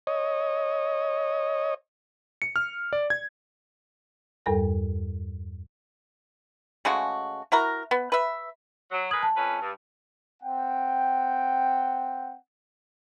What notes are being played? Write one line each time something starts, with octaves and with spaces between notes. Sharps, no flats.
C#5 D#5
C#7
F6
D5
G#6
E2 G2 G3 A4 A#4 G5
C#3 G#3 A3 F#4
E4 F#4 A#4 A#5
B3
B4 E5
F#3
G#3 A#4 B4 D#6 G#6 F#7
A5
F2 C#4 B4
G2
C4 F#5 G5